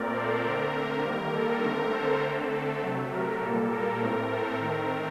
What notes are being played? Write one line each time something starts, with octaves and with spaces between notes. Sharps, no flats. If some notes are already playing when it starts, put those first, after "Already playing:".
Already playing: A#2 A3 C4 A#4 D5
A4 C5
D3 A3 C4 A#4
D#3 G3 A#3 A#4
A4
D3 A3 C4 A#4
A4 C5
D3 A3 C4 A4
C3 F#3 A3
A#4
A#2 G3 A#3 A4
A#4
A2 A3 C4
A4
D#3 A3 C4 A#4